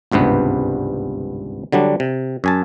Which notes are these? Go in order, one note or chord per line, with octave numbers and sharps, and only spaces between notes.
G#1 C#2 G2 C3 B3
D3 F#3 G3 D4
C3
F#2 G#5 A5